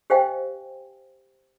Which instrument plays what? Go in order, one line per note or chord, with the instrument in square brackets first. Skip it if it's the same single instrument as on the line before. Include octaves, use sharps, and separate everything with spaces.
[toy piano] G4 C5 D#5 F5 G5 G#5